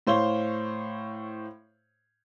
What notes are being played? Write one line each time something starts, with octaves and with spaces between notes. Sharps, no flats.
A2 C5 C#5 F5 G7